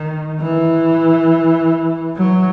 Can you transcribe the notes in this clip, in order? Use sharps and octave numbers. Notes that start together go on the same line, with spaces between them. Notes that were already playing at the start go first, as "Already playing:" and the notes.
Already playing: D#3
E3
F#3